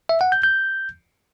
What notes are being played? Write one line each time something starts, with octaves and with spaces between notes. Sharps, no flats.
E5
F#5
G6
G6